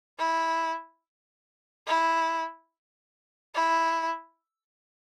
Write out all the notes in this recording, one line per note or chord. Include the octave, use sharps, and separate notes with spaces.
E4
E4
E4